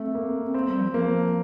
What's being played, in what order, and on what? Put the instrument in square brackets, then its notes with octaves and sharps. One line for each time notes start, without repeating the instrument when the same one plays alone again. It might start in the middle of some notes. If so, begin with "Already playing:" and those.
Already playing: [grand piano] A3 [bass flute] C4
[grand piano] A#3
[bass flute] C4
[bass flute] A#3 [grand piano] C4
[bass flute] G3
F3
[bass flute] F3 [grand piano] A#3